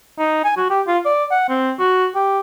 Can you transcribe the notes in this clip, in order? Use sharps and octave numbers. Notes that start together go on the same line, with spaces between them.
D#4
G#5
F#4
G4
F4
D5
F#5
C4
F#4
G4